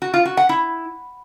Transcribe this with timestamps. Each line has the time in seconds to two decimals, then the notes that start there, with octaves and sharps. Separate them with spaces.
0.02 F#4
0.14 F4
0.25 F#4
0.37 F#5
0.49 E4